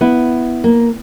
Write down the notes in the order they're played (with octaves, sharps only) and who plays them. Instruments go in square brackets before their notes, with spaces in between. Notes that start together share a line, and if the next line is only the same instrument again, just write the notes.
[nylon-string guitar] B3 E4
A#3